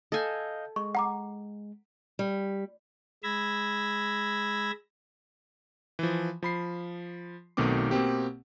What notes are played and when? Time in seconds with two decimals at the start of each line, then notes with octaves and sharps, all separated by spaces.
0.12 A4 D#5 F5 G#5 G6
0.76 G#3 C#6
0.95 F#5 A#5 D6
2.19 G3
3.23 G#3 B5 E6 G#6 A#6
5.99 E3 F3
6.43 F3 B5 C7
7.57 B1 B2 D#3 A3 C4 D6
7.91 B2 A#3 C4 G4